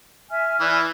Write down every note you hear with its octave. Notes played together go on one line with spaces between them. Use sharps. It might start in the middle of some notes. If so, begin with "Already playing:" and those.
E5 G#5 F6
E3 D5 F6